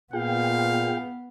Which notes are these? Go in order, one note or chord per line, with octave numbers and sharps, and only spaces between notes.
A#2 B3 F4 G#4 F5 G5